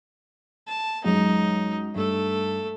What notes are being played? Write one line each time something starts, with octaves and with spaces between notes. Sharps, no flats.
A5
F#2 G#3 D#4
G2 A3 A4